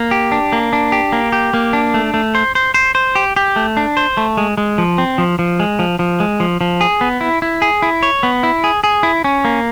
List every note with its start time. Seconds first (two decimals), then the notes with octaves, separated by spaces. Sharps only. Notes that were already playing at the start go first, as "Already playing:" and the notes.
Already playing: A#3
0.11 G4
0.32 D4
0.53 A#3
0.73 D4
0.92 G4
1.13 A#3
1.32 G4
1.54 A#3
1.73 D4
1.94 A3
2.14 A3
2.35 C5
2.55 C5
2.74 C5
2.95 C5
3.15 G4
3.36 G4
3.56 A3
3.77 D4
3.97 C5
4.17 A3
4.37 G#3
4.58 G#3
4.78 F3
4.98 C4
5.18 F3
5.39 F3
5.60 G#3
5.79 F3
5.99 F3
6.20 G#3
6.40 F3
6.61 F3
6.81 G#4
7.01 B3
7.21 E4
7.42 E4
7.62 G#4
7.82 E4
8.03 C#5
8.23 B3
8.43 E4
8.64 G#4
8.84 G#4
9.03 E4
9.24 C#4
9.45 A#3